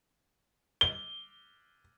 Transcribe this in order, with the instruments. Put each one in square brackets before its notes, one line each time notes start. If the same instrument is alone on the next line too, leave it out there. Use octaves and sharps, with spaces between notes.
[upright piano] G7